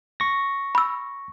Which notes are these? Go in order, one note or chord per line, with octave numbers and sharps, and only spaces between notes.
C#6 A#6
B5 E6